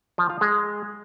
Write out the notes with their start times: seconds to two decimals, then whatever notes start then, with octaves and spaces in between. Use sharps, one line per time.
0.18 F3
0.30 F4
0.41 G#3